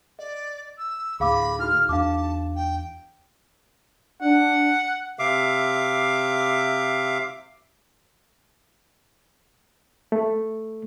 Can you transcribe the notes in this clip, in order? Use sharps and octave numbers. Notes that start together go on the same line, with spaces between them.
D5 D#5
E6
D2 A2 G#4 F5 B5 D6
D#4 E4 F#4 F6
E2 D4 F5 A5 D6
G5
D4 F#5
C3 E5 F5 D6
A3